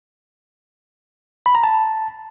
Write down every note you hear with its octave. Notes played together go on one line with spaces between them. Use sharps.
B5
A#5
A5